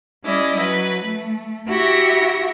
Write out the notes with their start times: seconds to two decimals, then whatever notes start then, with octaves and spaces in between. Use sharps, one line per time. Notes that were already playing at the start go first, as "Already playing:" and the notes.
0.24 G3 C#4 E4 D5 D#5
0.57 F#3 B4
1.03 A3
1.67 E4 F#4 G4 E5 C#6 A#6